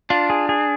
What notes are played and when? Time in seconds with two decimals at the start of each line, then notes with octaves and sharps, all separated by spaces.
0.10 D4 F4
0.30 G#4
0.49 G#4